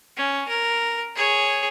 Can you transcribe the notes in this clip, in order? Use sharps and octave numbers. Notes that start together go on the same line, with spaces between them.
C#4
A#4
G#4 C#5